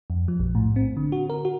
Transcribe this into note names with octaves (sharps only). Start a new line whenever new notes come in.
F2
F3
A#1
A2
C4
D3
F#4
A#4
F#4